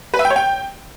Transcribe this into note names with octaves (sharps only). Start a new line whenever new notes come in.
B4
E5
G5
C#5
G5